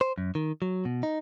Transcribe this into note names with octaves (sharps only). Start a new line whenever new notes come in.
C5
F#2
D#3
F#3
B2
D#4